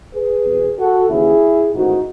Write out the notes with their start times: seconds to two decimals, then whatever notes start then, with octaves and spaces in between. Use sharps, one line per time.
0.14 G#4 B4
0.45 E2 B2
0.78 F#4 A4
1.09 D#2 C#3 E3 E4 G#4
1.74 A1 G#2 D#3 D#4 F#4